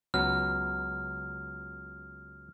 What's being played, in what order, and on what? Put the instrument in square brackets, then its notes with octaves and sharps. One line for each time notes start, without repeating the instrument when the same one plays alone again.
[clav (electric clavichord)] C#2 F#3 B3 [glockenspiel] F6